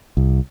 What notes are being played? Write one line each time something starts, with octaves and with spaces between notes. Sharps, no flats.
C2